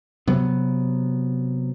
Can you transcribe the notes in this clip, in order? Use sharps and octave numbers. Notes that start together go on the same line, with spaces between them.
C3 F#3 B3